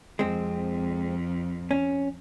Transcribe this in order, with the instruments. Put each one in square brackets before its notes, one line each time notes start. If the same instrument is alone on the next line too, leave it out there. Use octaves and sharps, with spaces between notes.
[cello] F2 [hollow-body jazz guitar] G#3 C4
[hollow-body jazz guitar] C#4